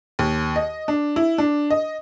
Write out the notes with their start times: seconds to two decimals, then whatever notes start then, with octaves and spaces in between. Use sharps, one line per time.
0.19 D#2
0.56 D#5
0.88 D4
1.16 E4
1.38 D4
1.71 D#5